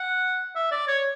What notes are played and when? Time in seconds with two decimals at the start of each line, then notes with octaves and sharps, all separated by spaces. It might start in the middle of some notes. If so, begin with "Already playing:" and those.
Already playing: F#5
0.55 E5
0.71 D5
0.88 C#5